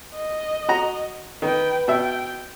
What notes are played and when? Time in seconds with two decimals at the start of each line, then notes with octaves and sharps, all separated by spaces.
0.16 D#5
0.69 F#4 A#5
1.42 D#3 B4 G5
1.88 B2 E5 G5